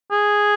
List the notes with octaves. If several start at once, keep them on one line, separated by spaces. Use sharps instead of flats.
G#4